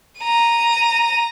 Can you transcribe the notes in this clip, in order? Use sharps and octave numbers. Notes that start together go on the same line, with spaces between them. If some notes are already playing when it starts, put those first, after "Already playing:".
A#5 D#7